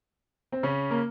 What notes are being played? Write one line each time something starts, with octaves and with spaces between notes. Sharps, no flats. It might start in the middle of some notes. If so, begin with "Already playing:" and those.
C4
C#3 C#4
A#3